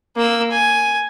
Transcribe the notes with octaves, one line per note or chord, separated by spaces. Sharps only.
A#3 E6
G#5